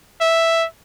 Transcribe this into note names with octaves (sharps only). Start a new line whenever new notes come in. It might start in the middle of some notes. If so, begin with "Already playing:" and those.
E5